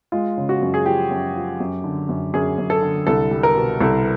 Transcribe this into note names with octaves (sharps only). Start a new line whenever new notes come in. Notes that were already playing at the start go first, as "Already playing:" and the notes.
G#3 F4
C#3
F#4
F#2
G#4
F3 G4
F#2
F3
F#2
D3
F#2
F#2 G#4
F#2
A4
D3
C2 A4
G3
A#4
B2
C2 A4